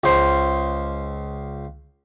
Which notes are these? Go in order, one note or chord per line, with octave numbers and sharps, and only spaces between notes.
C#2 C5